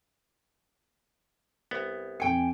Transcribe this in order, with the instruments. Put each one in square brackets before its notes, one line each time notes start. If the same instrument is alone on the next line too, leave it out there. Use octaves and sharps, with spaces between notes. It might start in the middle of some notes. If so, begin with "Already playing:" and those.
[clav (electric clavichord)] C2 B3
[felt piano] F2 C#7 [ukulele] G5 G#5